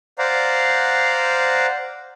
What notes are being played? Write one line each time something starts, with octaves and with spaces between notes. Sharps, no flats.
C5 D5 F5 F#5 A#5